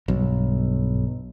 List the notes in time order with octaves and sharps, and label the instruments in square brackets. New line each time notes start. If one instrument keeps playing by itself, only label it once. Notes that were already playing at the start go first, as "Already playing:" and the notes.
[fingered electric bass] B1 [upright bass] G2